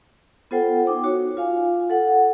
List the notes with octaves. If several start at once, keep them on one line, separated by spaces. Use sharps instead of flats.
B3 F4 A4 C5 F#5 G5
D#4 G5 D6
D#4 F#4 C#5
F4 F5 G#5
A4 F#5